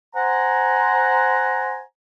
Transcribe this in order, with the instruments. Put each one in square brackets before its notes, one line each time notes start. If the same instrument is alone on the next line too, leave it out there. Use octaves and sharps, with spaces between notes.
[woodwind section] C5 F#5 G#5 A#5